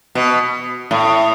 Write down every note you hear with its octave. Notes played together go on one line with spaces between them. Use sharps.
B2
A2